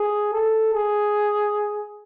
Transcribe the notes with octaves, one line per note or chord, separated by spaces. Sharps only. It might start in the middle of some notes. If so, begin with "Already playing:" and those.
Already playing: G#4
A4
G#4